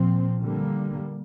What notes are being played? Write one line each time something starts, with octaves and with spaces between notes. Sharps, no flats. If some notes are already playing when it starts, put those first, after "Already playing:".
Already playing: A#2 F3 C4
D3 G3 A#3